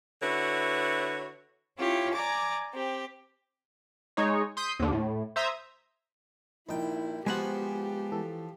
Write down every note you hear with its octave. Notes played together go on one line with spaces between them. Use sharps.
D3 E4 F#4 B4 C#5
C#4 E4 F4 G4 C#5
D5 G#5 A#5 D6
C4 G4
G#3 D#4 C#5
C6 D#6 G6 B6
D#2 D3
A2
C5 E5 A#5 D#6 G#6
A#1 D#4 E4 G5
F3 G#3 B3 F#4 G4 C5 F#5 G#5
E3 A4